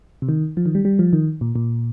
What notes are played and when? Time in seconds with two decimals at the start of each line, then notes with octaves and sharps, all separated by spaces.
0.22 C3
0.29 D#3
0.57 F3
0.66 D#3
0.75 G3
0.85 G3
0.99 F3
1.13 D#3
1.41 A#2
1.56 A#2